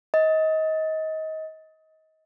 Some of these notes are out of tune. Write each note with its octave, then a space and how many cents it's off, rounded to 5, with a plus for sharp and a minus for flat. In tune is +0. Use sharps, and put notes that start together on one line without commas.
D#5 +25